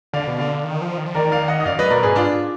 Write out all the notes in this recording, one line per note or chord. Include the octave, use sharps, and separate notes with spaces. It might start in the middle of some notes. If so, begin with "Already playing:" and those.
D3 D5 F5
B2
D3 D5 F5
D#3
F3
D#3
F3
D#3 A#4 D5
D5 F5
D#5 F#5
D#5
F#2 D5 F5
F#2 B4 D#5
B2 A#4 D5
G#2 G#4 B4
D4 F4